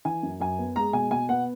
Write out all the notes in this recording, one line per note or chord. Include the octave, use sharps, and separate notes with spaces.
E3 G#5
F#2
F#2 G#5
B3
G#3 A#5
B2 G#5
B2 G#5
B3 F#5